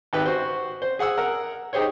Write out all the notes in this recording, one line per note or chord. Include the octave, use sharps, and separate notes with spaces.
G#1 G4 B4
F#4 C5
C5
G#4 F#5 G#5 E6
A#4 F#5
D#4 G4 G#4 C5 C#5